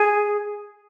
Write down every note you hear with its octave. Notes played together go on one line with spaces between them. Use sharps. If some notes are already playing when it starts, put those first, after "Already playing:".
Already playing: G#4